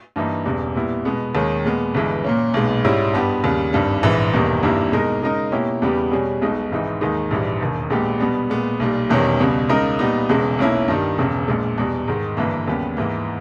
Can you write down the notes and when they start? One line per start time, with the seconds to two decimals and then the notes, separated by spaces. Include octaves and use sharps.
0.16 G2 E3 A#3 D#4
0.45 E1 E2 C#3 G3
0.75 A#2 G3 B3 E4
1.05 B2 G#3 B3
1.35 D#2 D#3 G#3 C#4
1.64 A#2 G#3 B3
1.94 G1 G2 E3 G#3
2.24 A#2 A#3 C#4
2.54 B1 A#2 G#3 B3
2.84 G#2 G3 C#4 E4
3.14 G2 G3 B3 G4
3.44 D#2 C#3 G3
3.73 G#1 G2 G3
4.03 A#1 G#2 E3
4.33 E1 E2 D#3 G3 A#3
4.63 G#1 G2 G3 A#3 E4
4.92 B2 G#3 D#4 A#4
5.22 C#3 G#3 D#4 A#4
5.52 B2 A#3 C#4 E4 G4
5.82 E2 C#3 G3 B3 G4
6.12 B2 G3 C#4 G#4
6.41 B1 B2 G#3 D#4
6.71 G#1 G#2 E3 G#3 D#4
7.01 D#2 D#3 G#3 D#4
7.31 A#1 G#2 E3 G3
7.61 E1 D#2 D#3
7.90 A#1 A#2 G#3 B3 G4
8.20 B2 G3 B3
8.50 A#2 G#3 B3
8.80 B1 A#2 G3
9.09 E1 E2 D#3 G3 C#4
9.39 C#2 B2 G3
9.69 C#2 C#3 G#3 D#4 A#4
9.99 A#2 G3 B3 D#4
10.29 E1 E2 C#3 G#3
10.59 B1 B2 A#3 C#4 E4
10.88 G2 D#3 G3
11.18 E1 E2 C#3
11.48 A#1 A#2 G#3
11.78 E2 B2 G3
12.08 G#2 D#3 G#3
12.37 G1 G2 E3 A#3
12.67 D#2 C#3 G3 B3 G4
12.97 G#2 E3 A#3